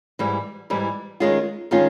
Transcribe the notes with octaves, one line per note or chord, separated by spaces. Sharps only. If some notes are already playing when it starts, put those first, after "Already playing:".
G#2 E3 G3
G#2 E3 G3
D#3 G#3 C#4 F4
D#3 G#3 C#4 F4